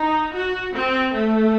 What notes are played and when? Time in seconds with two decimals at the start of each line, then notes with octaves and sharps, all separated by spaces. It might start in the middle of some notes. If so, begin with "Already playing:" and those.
Already playing: D#4
0.34 F#4
0.73 C4
1.12 A3